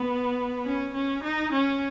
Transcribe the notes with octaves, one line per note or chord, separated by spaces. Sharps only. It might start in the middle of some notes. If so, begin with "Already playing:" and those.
Already playing: B3
C#4
C#4
D#4
C#4